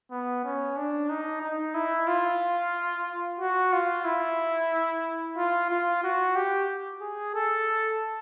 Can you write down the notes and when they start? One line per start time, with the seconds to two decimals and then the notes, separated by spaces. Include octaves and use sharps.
0.11 B3
0.44 C#4
0.77 D4
1.09 D#4
1.42 D#4
1.75 E4
2.07 F4
3.40 F#4
3.73 F4
4.05 E4
5.37 F4
5.70 F4
6.03 F#4
6.36 G4
7.01 G#4
7.35 A4